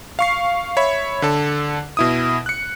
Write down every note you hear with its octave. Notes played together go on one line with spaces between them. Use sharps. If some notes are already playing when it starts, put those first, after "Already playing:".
F5 C#6 C7
C#5 E5 B5
D3 A4
B2 E4 D#6
F#6 C#7